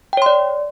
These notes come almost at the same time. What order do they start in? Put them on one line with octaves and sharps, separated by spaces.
G5 C#5 C6 D5